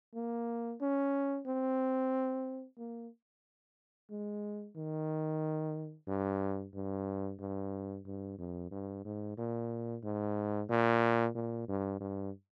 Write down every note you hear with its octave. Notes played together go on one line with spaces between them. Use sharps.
A#3
C#4
C4
A#3
G#3
D#3
G2
G2
G2
G2
F2
G2
G#2
A#2
G#2
A#2
A#2
G2
G2